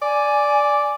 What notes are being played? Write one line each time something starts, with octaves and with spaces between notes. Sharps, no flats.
D5 G#5